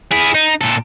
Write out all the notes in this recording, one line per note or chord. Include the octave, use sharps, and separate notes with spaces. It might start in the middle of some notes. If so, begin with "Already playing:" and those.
E4 G#4
D#4
A#2 A4